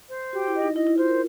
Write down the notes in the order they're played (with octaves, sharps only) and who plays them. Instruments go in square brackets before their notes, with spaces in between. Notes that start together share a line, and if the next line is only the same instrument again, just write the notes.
[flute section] C5
[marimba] F#4 [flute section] G4
[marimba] E4
[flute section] D#5
[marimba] D#4
[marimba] E4 [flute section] D#5
[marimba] E4
[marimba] F4 [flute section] C5
[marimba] A#4